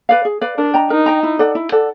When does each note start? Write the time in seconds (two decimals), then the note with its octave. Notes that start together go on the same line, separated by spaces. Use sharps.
0.09 B4 D5 F5
0.25 G#4
0.41 B4 D5 F5
0.58 D4 A#4
0.74 D#5 G5 A#5
0.90 D#4 A#4
1.06 D#5 G5 A#5
1.23 E4
1.39 A4 D5 F#5
1.55 E4
1.72 A4 D5 F#5